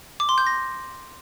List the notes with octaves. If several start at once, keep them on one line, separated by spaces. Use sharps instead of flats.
D6
C6
G6
A#6